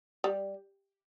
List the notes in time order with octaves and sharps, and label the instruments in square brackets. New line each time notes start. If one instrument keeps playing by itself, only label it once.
[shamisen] G3